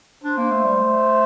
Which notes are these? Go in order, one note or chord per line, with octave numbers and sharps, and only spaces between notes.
D4 C5
A#3
A3
G3
A3